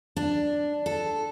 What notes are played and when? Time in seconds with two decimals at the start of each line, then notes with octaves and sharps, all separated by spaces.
0.16 D4
0.86 A4